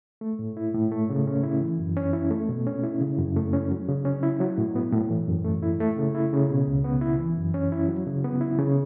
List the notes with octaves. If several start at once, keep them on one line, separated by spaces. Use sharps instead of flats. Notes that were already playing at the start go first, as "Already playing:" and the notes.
A3
A2
E4
A2
A3
C#3
C#4
E4
E3
F#2
C#4
E4
A3
B2
C#4
E4
C#3
F#2
A3
C#4
F#3
C#3
C#4
E4
F#3
A2
B3
A2
E3
F#2
A3
E4
A3
C#3
E4
C#3
B2
C#2
B3
E4
E3
F#2
C#4
E4
F#3
C#3
B3
E4
C#3